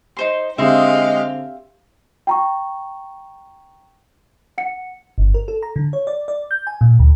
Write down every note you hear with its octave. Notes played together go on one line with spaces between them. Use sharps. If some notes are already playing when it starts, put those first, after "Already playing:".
D#4 C5 C6
D3 G#3 C4 G4 E5 F5 C6
G5 A#5 C#6
F#5 C#7
G1
A#4
A4
A#5
D3
C#5
D5
D5
G6
G#5
A#2
D2